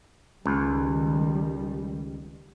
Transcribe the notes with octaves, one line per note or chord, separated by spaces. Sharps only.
C#2 D#3 G3